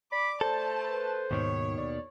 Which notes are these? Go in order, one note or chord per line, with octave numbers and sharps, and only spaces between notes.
D5 B5 D6
A3 A4 C5 A5
B4
D#2 G#2 B2 D#3 C#5
D5